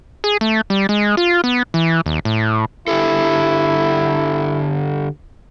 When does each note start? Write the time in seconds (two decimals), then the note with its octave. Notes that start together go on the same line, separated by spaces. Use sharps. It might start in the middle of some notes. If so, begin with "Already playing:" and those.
0.24 G#4
0.41 A3
0.70 G3
0.89 G#3
1.17 F4
1.44 B3
1.74 E3
2.06 D#2
2.25 A2
2.88 D3 E4 G4 A4